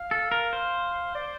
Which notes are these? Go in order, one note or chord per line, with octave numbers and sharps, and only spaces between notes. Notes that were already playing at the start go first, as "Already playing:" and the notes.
Already playing: F5
A4
A#4
C5
D5